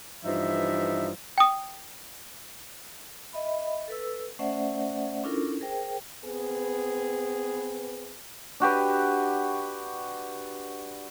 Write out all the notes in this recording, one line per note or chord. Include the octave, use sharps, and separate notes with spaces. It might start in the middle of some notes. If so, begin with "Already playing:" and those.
G2 E3 F3 D#4 E5
G5 D#6
D#5 E5 B5
A4 B4 E6
A3 C#4 C5 D5 E5 F#5
C#4 D4 E4 F4 A4 A#4
G#4 A#4 C5 G5
B3 C4 G#4 B4
D4 F#4 G4 B4